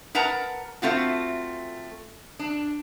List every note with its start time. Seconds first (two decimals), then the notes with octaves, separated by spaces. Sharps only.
0.15 A#4 B4 F#5 A5 A#5
0.82 A3 C4 F4 F#4
2.39 D4